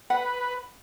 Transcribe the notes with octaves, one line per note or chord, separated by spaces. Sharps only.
B4 F#5